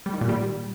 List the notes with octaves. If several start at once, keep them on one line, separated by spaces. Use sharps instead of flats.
G3
D#3
A#2
G3